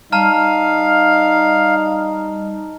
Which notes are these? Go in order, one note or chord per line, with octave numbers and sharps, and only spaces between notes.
G3 D#4 F5 A5 A#5 F6